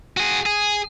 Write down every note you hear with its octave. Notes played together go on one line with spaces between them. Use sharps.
F#4 G#4
G#4